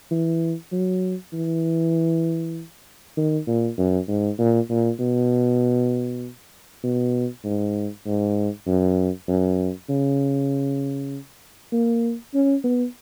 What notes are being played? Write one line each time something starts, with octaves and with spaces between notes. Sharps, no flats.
E3
F#3
E3
D#3
A#2
F#2
G#2
A#2
A#2
B2
B2
G#2
G#2
F#2
F#2
C#3
A#3
C#4
B3